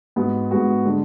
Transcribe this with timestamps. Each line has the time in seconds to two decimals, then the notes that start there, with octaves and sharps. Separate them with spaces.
0.16 G#2 G#3 B3 F#4
0.51 G#2 G#3 B3 F#4
0.85 D3 G#3